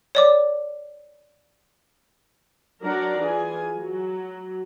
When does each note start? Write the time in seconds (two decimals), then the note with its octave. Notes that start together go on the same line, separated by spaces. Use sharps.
0.15 C#5 D5 D6
2.82 F#3 D4 A#4 D5 F#5 A#5
3.20 E3 F4 G#4 G#5
3.77 F#3